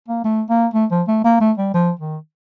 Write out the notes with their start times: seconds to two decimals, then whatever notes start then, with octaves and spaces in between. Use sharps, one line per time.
0.08 A#3
0.24 A3
0.50 A#3
0.74 A3
0.91 F3
1.08 A3
1.24 A#3
1.41 A3
1.58 G3
1.74 F3
1.99 D#3